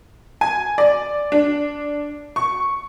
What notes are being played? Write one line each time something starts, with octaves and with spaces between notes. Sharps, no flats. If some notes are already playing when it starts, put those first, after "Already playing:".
G#5
D5
D4
C#6